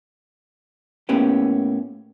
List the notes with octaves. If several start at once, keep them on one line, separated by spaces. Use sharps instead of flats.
A2 A#3 B3 C#4 G4